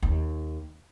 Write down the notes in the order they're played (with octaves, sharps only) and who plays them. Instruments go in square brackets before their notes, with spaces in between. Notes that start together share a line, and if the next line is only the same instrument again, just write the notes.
[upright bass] D#2